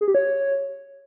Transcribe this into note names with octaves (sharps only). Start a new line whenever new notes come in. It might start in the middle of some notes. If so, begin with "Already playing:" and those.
G#4
G4
C#5